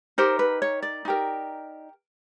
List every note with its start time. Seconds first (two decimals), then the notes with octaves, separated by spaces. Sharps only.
0.18 D#4 G4 A#4 C5
0.39 B4
0.62 C#5
0.82 D5
1.05 D#4 G4 A#4